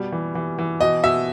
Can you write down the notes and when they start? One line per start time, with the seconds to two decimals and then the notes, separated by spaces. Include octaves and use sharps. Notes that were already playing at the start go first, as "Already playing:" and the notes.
Already playing: B2 G3
0.12 E3
0.35 E3
0.59 E3
0.81 B2 D#5
1.04 B2 E5